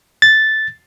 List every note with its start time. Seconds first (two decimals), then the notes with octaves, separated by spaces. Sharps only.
0.22 A6